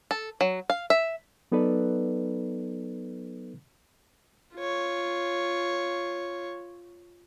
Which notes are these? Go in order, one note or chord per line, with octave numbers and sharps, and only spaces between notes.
A4
F#3
F5
E5
F#3 B3 D#4 A4 B4 D5
F4 C#5